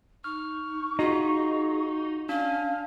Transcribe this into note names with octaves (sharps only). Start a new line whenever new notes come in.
D#4 C#6 F6
D#4 F4 F#4 G#4
C#4 D4 F5